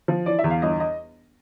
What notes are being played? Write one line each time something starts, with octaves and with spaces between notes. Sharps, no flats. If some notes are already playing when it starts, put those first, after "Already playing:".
F3
E3 D5
E5
E2
F5
G1 D#5
D#5